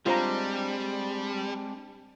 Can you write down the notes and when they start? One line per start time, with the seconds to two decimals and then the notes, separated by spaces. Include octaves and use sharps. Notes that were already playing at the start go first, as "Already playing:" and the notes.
0.06 G3 G#3 C4 D4 F4 C5 A#5